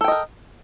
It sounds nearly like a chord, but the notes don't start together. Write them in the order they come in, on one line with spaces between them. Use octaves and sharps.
A4 G5 D#5 A#4